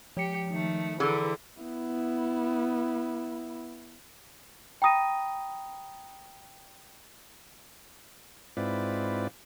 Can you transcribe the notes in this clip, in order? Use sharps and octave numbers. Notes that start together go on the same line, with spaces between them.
F3 G4 C#7
D#3 A3
D3 E3 G#4 A#4 B4
B3 E4
G5 A#5 B5 D#6 A#6 D#7
G#2 C4 E4 F4 B4 D5